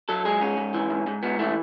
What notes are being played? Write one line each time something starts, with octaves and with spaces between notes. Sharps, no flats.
F#3 A4
G#3 G#4
G#2 C#4
G#2
E3
G#2
G#2
G#2 B3
E3 A3